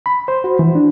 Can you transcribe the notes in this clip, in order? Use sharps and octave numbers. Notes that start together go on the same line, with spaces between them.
B5
C5
F#4
E3
D4